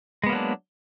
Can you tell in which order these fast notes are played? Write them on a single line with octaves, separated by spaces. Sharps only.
G#3 B3 A#3 F#3 D4